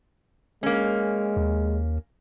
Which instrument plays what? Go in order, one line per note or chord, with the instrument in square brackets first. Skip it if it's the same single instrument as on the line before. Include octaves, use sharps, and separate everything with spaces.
[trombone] G#3 [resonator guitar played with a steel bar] A#3 C#4
[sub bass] D#2